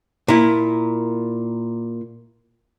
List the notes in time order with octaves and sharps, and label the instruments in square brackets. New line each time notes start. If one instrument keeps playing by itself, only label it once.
[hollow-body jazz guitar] A#2 E4